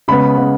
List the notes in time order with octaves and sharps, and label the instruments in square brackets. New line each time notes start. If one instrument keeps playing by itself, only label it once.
[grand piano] C#3 G#3 B3 B5
C#3 G#3 B3